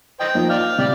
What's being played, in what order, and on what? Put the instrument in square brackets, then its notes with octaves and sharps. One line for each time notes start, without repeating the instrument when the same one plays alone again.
[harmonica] C5 D#5 G5
[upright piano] F3 A#3 D#4
[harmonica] D5 F5
[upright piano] C3 [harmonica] G4 D5